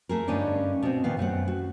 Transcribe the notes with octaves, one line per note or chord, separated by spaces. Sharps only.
A3 G#4 A#4
G2 D3 C#4 D#4 D5
B2 C4
A#2 D#3 B3 F5
F#2 A3 C4 F#5
F#4